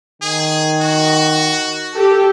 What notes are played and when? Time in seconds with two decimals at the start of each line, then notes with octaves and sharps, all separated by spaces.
0.22 D#3 G#4
0.81 F#4
1.95 G4 A4